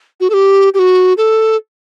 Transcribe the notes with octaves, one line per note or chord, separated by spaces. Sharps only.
F#4
A4
G4
G4
F#4
A4